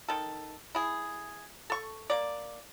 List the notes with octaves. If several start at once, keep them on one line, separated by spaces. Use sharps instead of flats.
D#3 A4
E4 G#4
A4 C#6
A#3 D5